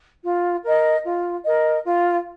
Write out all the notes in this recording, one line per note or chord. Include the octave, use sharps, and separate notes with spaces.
F4
A#4 D#5
F4
A#4 D#5
F4